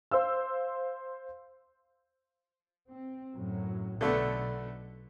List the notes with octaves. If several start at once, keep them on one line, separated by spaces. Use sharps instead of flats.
C5 F5 E6
C4
F#2 A2 F#3
B1 B2 D3 A3 B3